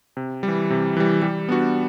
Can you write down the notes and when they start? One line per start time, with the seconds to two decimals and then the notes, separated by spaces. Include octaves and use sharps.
0.17 C3
0.43 E3 G3
0.70 C3
0.97 E3 G3
1.22 G3
1.49 B3 D4 F#4